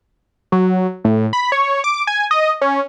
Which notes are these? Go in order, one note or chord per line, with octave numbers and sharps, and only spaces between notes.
F#3
A2
B5
C#5
D6
G#5
D#5
C#4